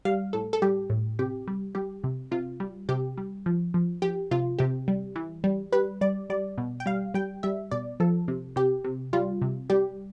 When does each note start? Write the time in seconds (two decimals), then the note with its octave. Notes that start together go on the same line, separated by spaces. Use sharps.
0.05 G3 F5
0.33 A2 A4
0.53 A4
0.62 G3 G4
0.90 A2
1.19 C3 G4
1.48 G3
1.75 G3 G4
2.04 C3
2.31 C3 F4
2.60 G3
2.89 C3 G4
3.18 G3
3.46 F3
3.74 F3
4.02 F3 G4
4.31 C3 F4
4.59 C3 G4
4.88 G3
5.16 E3
5.44 G3
5.72 G3 B4
6.01 G3 D5
6.30 G3 D5
6.58 B2
6.80 G5
6.86 G3 F5
7.14 G3 G5
7.43 G3 E5
7.71 B2 D5
8.00 F3 A4
8.28 C3
8.56 C3 G4
8.84 C3
9.13 G3 F4
9.42 C3
9.70 G3 G4